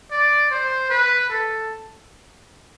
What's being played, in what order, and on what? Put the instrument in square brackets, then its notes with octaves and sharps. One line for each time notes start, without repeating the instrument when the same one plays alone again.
[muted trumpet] D5
C5
B4
A4